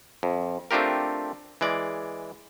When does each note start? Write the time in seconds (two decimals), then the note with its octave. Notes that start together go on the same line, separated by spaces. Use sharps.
0.23 F2
0.71 A3 C4 D4 F4 G4 A#4
1.61 E3 G#3 D5